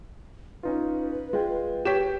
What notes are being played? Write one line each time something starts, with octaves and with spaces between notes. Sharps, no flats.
C#4 D#4 F4 B4
G#3 F4 G5
G4 C#5 B6 E7